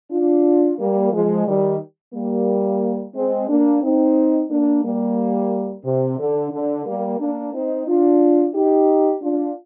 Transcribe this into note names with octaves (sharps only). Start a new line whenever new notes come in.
D4 F4
G3 A#3
F3 G#3
D#3 G3
G3 A#3
G#3 C4
A#3 D4
C4 D#4
A#3 D4
G3 A#3
C3
D3
D3
G3 A#3
A#3 D4
C4 D#4
D4 F4
D#4 G4
D4 F4